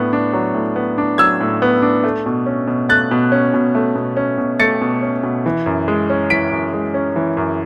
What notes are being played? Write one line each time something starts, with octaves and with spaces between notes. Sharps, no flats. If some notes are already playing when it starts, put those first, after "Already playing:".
Already playing: A2 B3 D4
D4
F#3
A2
B3
D4
F#3 E6 G#6
A2
B3
D4
A3
B2
C#4
B2
A3 F#6 A6
B2
C#4
B2
A3
B2
C#4
B2
A3 A6 C#7
B2
C#4
B2
E3
F#2
G#3
C#4
E3 B6 D7
F#2
G#3
C#4
E3
F#2